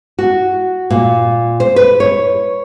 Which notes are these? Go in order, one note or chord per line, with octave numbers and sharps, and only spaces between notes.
F#4
A#2
C5
B4
C#5